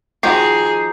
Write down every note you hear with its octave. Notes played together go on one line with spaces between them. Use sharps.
D#3 F3 F#4 G#4 A#5 D6 G6 C7